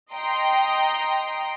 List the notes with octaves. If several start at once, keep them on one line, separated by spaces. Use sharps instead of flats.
D#5 G5 A#5 C6